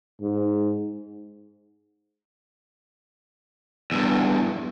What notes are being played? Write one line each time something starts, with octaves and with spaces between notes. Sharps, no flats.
G#2
E2 G2